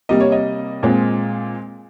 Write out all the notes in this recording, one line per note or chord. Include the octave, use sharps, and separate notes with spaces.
C3 G3 A#3 D#5
C#5
D#5
A#2 G#3 C4